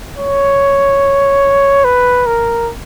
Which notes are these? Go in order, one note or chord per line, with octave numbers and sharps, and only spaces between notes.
C#5
B4
A#4